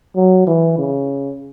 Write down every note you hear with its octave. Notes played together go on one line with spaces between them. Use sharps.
F#3
E3
C#3